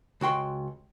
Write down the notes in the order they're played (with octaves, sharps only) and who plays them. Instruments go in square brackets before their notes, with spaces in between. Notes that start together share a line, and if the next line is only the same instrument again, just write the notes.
[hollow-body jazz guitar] C#2 F#4 G5 C6